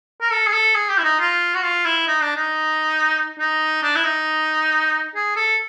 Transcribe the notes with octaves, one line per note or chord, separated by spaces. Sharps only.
A#4
A4
G#4
A4
G#4
G4
E4
D#4
F4
F#4
F4
E4
D#4
D4
D#4
D#4
D4
E4
D#4
G#4
A4